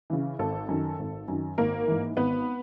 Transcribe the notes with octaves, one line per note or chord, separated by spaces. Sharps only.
C#3 E3
G#1 A4
F#2 D#3
G#1
F#2 D#3
G#1 A#3 A#4
G#2 E3
G#1 B3 B4